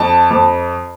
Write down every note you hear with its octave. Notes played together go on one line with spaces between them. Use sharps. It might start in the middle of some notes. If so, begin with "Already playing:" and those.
Already playing: F2 A5
F2